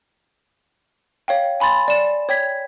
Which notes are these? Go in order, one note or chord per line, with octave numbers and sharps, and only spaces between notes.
C#5 F5 G5
G#5 B5 C6 A6
D5 E7
C#5 G5 G#6 B6